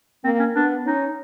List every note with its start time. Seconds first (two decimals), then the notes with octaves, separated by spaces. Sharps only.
0.24 A#3 C4
0.40 C#4
0.55 B3 D4
0.85 C#4 D#4